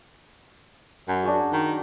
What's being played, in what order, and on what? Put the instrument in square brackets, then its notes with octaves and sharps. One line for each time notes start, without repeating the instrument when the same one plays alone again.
[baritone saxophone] F#2
[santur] D4 F#4 G#4
[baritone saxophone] D#3